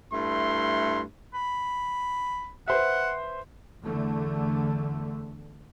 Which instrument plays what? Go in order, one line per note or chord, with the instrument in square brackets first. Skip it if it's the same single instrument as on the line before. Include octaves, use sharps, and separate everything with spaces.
[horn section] G2 A3 E4 C6
[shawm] B5
[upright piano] B4 C5 E5 [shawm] F#5
[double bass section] E2 D3 A3